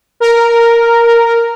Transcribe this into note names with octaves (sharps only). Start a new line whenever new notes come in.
A#4